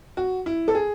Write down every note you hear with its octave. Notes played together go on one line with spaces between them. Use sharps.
F#4
E4
A4
G#4